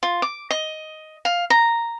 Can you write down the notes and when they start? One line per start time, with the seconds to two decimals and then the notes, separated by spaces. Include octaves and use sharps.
0.03 F4
0.22 D6
0.51 D#5
1.25 F5
1.50 A#5